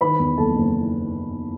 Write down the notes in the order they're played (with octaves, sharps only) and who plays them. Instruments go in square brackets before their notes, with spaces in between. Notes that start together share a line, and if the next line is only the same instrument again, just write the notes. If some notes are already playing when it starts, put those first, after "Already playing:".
[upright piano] D#3 B4 B5
E2
F#1 A4 A5
F#1